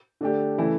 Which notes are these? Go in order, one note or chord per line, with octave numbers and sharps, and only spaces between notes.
D3 A3 D4 G4
C#3 E3 A3 E4